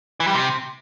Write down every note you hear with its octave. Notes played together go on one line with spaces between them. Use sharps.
E3
G3
C3